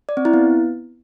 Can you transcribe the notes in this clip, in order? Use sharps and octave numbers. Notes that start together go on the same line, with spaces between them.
D5
C4
E4
B3